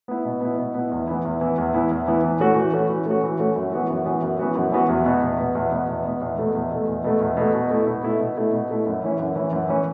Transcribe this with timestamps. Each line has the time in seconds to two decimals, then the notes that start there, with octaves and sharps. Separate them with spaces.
0.08 B3 E4
0.25 B2
0.41 B3 E4
0.59 B2
0.74 B3 E4
0.91 E2
1.08 E3 B3 E4
1.25 E2
1.41 E3 B3 E4
1.58 E2
1.74 E3 B3 E4
1.91 E2
2.08 E3 B3 E4
2.24 E3
2.40 A3 C#4 F#4
2.56 E3
2.73 A3 C#4 F#4
2.89 E3
3.06 A3 C#4 F#4
3.23 E3
3.39 A3 C#4 F#4
3.56 F#2
3.73 E3 B3 F#4
3.90 F#2
4.05 E3 B3 F#4
4.22 F#2
4.39 E3 B3 F#4
4.55 F#2
4.72 E3 B3 F#4
4.89 E2
5.05 B2 B3
5.23 E2
5.38 B2 B3
5.55 E2
5.72 B2 B3
5.88 E2
6.05 B2 B3
6.21 E2
6.38 B2 A3
6.54 E2
6.71 B2 A3
6.88 E2
7.04 B2 A3
7.21 E2
7.37 B2 A3
7.54 B2
7.71 A3 E4
7.87 B2
8.03 A3 E4
8.20 B2
8.37 A3 E4
8.53 B2
8.71 A3 E4
8.87 F#2
9.03 E3 C#4 E4
9.19 F#2
9.36 E3 C#4 E4
9.53 F#2
9.69 E3 C#4 E4